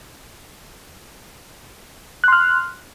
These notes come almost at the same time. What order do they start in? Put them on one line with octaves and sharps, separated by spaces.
F#6 C6 F6